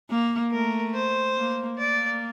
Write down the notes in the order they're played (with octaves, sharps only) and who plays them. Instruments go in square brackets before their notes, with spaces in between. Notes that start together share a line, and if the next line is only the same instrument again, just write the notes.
[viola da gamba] A#3
[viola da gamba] A3 [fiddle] A#4
[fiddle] C5
[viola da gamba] A#3
[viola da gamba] A#3 [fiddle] D5